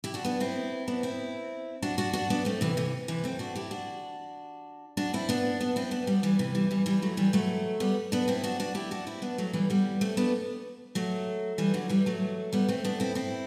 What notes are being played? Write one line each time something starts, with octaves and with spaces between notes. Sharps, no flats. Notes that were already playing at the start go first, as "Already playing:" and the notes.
E4 G4
D4 F#4
B3 D4
C4 E4
B3 D4
C4 E4
D4 F#4
D4 F#4
D4 F#4
B3 D4
A3 C4
C3 E3
C3 E3
C3 E3
A3 C4
D4 F#4
E4 G4
D4 F#4
D4 F#4
C4 E4
B3 D4
B3 D4
C4 E4
B3 D4
G3 B3
E3 G3
C3 E3
E3 G3
E3 G3
E3 G3
F#3 A3
E3 G3
F#3 A3
G3 B3
B3 D4
C4 E4
D4 F#4
D4 F#4
E4 G4
D4 F#4
C4 E4
B3 D4
F#3 A3
E3 G3
G3 B3
A3 C4
B3 D4
F#3 A3
E3 G3
D3 F#3
E3 G3
F#3 A3
G3 B3
A3 C4
B3 D4
C4 E4
C4 E4